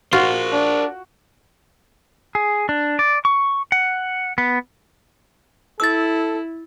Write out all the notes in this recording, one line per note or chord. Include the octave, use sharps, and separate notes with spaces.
F4 F#4 A#4 C5
D4
G#4
D4
D5
C#6
F#5
B3
E4 A4 E6 A6